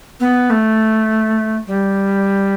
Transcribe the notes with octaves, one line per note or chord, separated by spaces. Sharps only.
B3
A3
G3